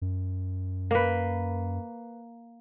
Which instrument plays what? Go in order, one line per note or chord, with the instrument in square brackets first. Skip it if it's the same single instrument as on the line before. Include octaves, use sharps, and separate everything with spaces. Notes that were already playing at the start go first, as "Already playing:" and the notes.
[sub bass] F#2
[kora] A#3 B4